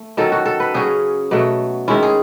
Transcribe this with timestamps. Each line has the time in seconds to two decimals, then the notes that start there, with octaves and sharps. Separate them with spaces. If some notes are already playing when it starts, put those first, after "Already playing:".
Already playing: A3
0.17 D#3 F#3 C#4 A4
0.32 F#4
0.45 A4
0.60 B4
0.74 C#3 F#3 C#4 G#4
1.31 B2 F#3 A3
1.88 D#3 G#3 C#4 E4
2.03 G#4